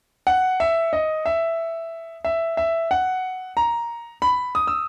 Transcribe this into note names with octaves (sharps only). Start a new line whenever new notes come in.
F#5
E5
D#5
E5
E5
E5
F#5
A#5
B5
D#6
E6